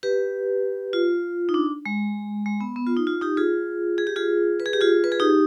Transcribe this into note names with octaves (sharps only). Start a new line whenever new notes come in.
G4 B4
F4
D#4
D4
G#3
G#3
B3
B3
F4
D#4
F4
D#4 G4
F4 G#4
G#4
G4
F4 G#4
B4
G#4
G4
F4 G#4
B4
G#4
D#4 G4